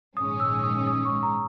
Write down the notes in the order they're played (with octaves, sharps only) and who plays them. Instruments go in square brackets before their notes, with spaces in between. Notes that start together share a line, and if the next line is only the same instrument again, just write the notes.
[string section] A#1 G#2 D#3 G#3 C#4 [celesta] D#6
[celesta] E6
D#6
D#6
C#6
A#5